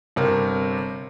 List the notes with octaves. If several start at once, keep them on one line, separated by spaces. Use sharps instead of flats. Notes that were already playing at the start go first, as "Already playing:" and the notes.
G1 C3 A#4